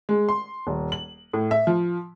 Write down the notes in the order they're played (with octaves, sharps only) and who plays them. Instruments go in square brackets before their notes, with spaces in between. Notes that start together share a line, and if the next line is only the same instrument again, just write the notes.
[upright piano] G#3
C6
D#1
F#7
A2
E5
F3